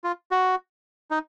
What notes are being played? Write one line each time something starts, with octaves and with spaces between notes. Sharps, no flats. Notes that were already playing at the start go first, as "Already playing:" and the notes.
F4
F#4
D#4